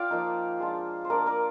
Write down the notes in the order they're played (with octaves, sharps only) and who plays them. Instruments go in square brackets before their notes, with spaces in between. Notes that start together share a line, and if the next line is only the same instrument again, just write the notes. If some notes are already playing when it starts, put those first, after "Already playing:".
Already playing: [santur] F4 D5 F5 G5
F3 A#3 D#4
G#3 D4 F4
C5
A#3 D4 F4 A#4 D5
A#4 D5